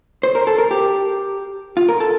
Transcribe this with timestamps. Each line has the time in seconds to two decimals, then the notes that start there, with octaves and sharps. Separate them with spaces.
0.23 C5
0.35 A#4
0.47 A4
0.58 A#4
0.71 G4
1.77 F4
1.89 A#4
2.00 A4